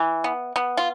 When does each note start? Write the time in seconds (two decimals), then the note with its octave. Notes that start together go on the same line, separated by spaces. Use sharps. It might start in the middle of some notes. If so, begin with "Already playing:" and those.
Already playing: E3
0.24 B3
0.56 B3
0.77 F4